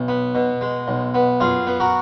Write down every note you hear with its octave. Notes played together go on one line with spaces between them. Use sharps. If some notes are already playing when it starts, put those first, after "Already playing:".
Already playing: B1
B3
B2
G#3
B1
B3
F#2 F4 G#4
B3
F#4 A#4